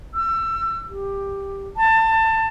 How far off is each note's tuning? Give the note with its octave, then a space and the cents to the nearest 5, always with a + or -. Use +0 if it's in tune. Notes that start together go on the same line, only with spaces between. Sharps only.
E6 +30
G4 +10
A5 +25